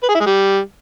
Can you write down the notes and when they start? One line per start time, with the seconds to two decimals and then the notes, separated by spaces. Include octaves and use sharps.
0.03 B4
0.08 G#4
0.14 E4
0.20 G#3
0.26 G3